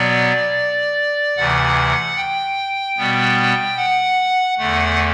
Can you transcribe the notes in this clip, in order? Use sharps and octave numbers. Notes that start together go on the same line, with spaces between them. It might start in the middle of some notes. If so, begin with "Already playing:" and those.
Already playing: B2 F#3 B3 D5
D2 C3 E3 F#5
G5
B2 G3 B3
F#5
E2 D3 A3 F#5